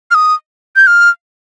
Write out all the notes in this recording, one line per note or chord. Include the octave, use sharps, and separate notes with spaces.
F6
D#6
G6
F6